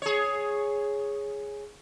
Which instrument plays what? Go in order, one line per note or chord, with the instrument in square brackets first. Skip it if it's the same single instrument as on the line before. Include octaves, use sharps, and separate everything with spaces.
[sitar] G#4 C#5